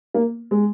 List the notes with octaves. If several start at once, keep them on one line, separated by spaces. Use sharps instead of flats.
A#3
G#3